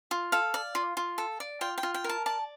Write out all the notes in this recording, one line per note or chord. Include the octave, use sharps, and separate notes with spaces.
F4
A4 F5
D5
F4
F4
A4
D5
F4 G5
G5
F4
G5
A#4 A5
D5 A5